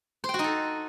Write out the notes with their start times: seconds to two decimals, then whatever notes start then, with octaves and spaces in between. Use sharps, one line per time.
0.24 C5
0.29 G5
0.34 F#4
0.39 D#4
0.44 A4